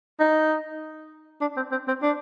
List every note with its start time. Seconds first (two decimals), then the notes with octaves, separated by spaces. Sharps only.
0.20 D#4
1.41 D4
1.57 C4
1.71 C4
1.88 C4
2.02 D4